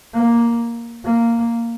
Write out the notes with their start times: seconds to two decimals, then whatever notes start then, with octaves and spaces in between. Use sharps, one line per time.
0.14 A#3
1.04 A#3